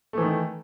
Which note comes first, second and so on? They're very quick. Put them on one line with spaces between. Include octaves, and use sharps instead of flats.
A3 E3 D#3